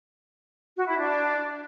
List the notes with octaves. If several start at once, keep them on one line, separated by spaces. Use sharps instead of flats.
F#4
E4
D4